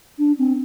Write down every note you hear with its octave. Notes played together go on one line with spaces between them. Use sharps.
D4
C4